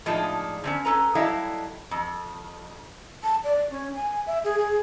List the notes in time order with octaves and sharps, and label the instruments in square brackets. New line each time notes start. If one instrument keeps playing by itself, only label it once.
[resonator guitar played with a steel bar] A2 F3 G#3 D4 D#4 F4
D3 C4 C#4
C#4 A4 B4 A#5
F#3 G3 E4 A4 D#5 F5
F2
[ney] A5
D5
C#4
G#5
E5
G#4
G#4